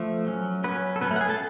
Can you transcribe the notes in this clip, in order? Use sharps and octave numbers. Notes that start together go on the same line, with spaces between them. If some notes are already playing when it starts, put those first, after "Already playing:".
Already playing: F3 A3
F#3 C#4
F#3 B3 C#4 B4
A4
F#3 B3 C#4 B4
A3 A4
F#5
G#4 G#5
A4 A5